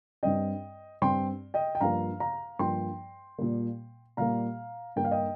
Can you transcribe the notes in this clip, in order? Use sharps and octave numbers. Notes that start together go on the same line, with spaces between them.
G2 G3 C4 D#5 G5
G2 G3 C4 G5 C6
D#5 G5
G5
G2 F3 A#3 F5 A#5
F5 A#5
G2 F3 A#3 G5 C6
A#2 G3 A#3
A#2 G3 A#3 F5 A#5
G2 G3 A#3 G5
F5
D#5 G5